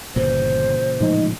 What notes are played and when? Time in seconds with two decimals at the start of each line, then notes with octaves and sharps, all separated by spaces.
0.16 G1 A#2 C#3 E3 C5
1.01 A2 F3 G#3 D#4